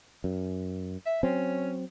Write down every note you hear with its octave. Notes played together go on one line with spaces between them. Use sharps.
F#2
E5
F#3 C4 C#4